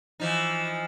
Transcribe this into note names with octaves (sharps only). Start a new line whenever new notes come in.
E3 F3 D#4